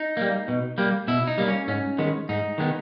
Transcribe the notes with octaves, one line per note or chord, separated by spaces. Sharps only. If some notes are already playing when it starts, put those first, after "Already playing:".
Already playing: D#4
G3 A#3
B2
G3 A#3
B2 E4
D#4
G3 A#3
C#4
G#2 C#4
D#3 G#3 B3
G#2 D#4
D#3 G#3 B3